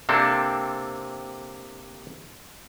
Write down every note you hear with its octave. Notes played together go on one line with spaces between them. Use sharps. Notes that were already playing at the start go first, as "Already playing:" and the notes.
C3 A#3 C4 D4 A4